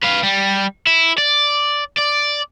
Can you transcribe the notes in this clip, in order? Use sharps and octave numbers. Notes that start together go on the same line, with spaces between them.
B4 F5
G3
E4
D5
D5